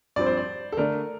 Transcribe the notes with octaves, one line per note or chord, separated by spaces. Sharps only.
G2 F3 C4 D5
C5
D5
A4
D3 A3 D4 A#4